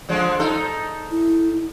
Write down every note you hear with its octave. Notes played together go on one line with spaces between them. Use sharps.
D3 F3 G#3
D#4 A4
E4